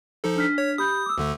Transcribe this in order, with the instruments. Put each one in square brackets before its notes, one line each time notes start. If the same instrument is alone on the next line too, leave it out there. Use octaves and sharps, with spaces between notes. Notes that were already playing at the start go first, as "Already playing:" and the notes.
[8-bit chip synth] F3 D#4 A4
[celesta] D4 F6 B6
[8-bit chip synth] C#5
[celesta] G4 B5 G6 [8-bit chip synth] D#6
[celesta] D6 E6
[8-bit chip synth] D2 D3 A3